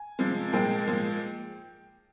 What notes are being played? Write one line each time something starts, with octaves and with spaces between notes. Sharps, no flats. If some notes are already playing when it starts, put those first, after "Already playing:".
Already playing: G#5
C3 F3 G#3
A#2 F3 G#3 G5
A#2 F3 G#3